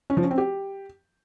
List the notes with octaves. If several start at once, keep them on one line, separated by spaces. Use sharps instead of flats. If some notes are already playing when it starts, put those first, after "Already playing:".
C#4
F3
C#4
C4
G4